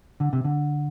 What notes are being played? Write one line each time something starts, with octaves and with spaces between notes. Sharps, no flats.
D3
C3
D3